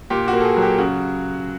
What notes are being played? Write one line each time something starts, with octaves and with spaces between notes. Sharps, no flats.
A#2 G4
F#4
A#3
A4
G#4
F#3
G4
C#3 F#4